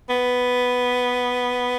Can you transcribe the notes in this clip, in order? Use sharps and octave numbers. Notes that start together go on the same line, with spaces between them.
B3